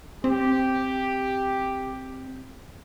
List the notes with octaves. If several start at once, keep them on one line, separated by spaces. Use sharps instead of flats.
C4 G4